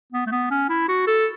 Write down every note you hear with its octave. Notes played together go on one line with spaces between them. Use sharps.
B3
A3
B3
C#4
E4
F#4
A4